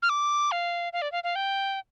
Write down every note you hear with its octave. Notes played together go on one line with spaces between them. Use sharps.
F6
D6
F5
F5
D5
F5
F5
G5